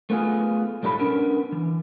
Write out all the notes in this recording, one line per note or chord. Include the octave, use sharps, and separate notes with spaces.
A3 B3 F4 G#4
B1 G#2 G3 A4 C#5 B5
B3 C#4 D4 A#4
E3